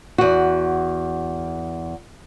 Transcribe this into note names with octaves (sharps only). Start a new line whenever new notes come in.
E2 F#4